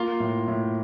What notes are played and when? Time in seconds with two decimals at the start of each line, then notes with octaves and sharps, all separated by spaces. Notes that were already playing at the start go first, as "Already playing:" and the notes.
Already playing: A#3 F4
0.20 A2
0.48 A2